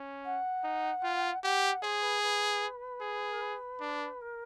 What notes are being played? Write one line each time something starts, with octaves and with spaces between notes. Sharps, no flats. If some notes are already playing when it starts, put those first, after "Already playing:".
Already playing: C#4
F#5
D#4
F4
G4 F#5
G#4 C5
B4
B4
G#4
A#4
B4
D4
A#4